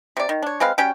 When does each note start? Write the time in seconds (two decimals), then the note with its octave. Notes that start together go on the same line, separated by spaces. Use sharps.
0.17 C3 D5
0.29 D#3
0.43 D4 C#5
0.60 G#3 C4 B4 F5
0.78 G3 C#4 F#4 G5